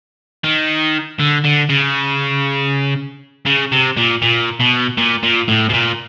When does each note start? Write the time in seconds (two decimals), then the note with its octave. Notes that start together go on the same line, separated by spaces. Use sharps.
0.44 D#3
1.20 D3
1.45 D3
1.70 C#3
3.46 C#3
3.72 C3
3.97 A#2
4.22 A#2
4.60 B2
4.98 A#2
5.23 A#2
5.48 A2
5.69 B2
5.73 A#2